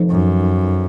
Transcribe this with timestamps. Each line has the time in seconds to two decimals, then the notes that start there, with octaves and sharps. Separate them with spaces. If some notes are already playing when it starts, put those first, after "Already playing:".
Already playing: F1 F2 D#3
0.10 F#2